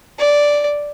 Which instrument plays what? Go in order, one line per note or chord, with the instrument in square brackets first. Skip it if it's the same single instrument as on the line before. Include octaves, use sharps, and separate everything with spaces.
[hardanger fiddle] D5